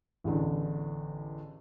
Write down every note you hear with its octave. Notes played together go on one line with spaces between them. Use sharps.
A1 E2 D3